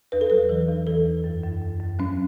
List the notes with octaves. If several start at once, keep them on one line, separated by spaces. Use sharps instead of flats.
E2 B4
A4
F#3 B4
E3
E2
E3 A4
E2
F#2
F#2
F#2
F#2
F#3 C#4